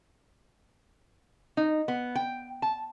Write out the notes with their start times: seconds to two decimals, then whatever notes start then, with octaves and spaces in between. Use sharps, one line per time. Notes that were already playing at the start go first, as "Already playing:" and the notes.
1.57 D#4
1.88 B3
2.15 G5
2.62 A5